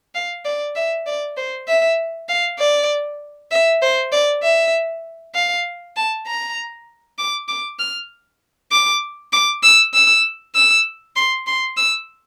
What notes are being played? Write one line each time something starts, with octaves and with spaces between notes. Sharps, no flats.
F5
D5
E5
D5
C5
E5
F5
D5
E5
C5
D5
E5
F5
A5
A#5
D6
D6
F6
D6
D6
E6
E6
E6
C6
C6
E6